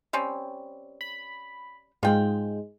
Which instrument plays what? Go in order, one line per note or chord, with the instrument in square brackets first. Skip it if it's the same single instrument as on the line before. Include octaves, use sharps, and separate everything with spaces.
[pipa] G3 C4 C#4
[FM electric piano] B5
[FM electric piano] G#2 G#3 [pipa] F4 G5